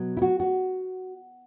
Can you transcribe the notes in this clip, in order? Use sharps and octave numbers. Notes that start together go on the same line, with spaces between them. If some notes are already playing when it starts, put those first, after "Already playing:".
Already playing: B2 F#3
E4
F#4
F#4